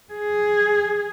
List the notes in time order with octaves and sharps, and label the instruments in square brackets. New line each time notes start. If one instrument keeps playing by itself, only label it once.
[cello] G#4